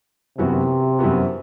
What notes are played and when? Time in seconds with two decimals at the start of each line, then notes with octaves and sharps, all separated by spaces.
0.38 F#2 C3 E3 B3 F#4
0.99 F#2 E3 B3 F#4